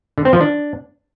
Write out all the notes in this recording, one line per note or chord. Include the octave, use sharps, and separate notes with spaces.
D3
C4
F3
D4